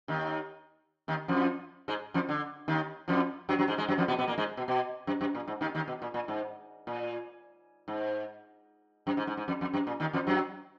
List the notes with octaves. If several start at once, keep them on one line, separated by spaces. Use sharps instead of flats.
D#2 D#3
D#2 D#3
F2 F3
G#2 G#3
F2 F3
D3
D#2 D#3
F2 F3
F#2 F#3
F#2 F#3
G#2 G#3
G#2 G#3
F#2 F#3
F2 F3
B2 B3
B2 B3
A#2 A#3
G#2 G#3
B2
B2
F#2
F#2
A#2
G#2
D#2 D#3
D#2 D#3
B2
A#2
A#2
G#2
A#2
G#2
F#2
G#2
G#2
G#2
F2
F2
F#2
A#2
D#2 D#3
F2 F3
F#2 F#3